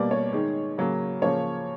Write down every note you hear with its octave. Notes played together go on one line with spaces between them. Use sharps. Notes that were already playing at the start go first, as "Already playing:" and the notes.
Already playing: B2 G3 A#3 D5
C#5
D#3 G#3
C#3 F#3 A#3
C#3 F3 A#3 C#5